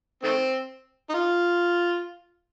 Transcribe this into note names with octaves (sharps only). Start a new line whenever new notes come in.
D#3 A3 C4
D#4
F4